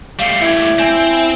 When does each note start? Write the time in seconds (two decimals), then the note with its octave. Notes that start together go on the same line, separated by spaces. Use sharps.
0.19 G3 A3 F5 C7 C#7
0.41 E4 D6 G#6
0.78 C4 D5 G#5 G6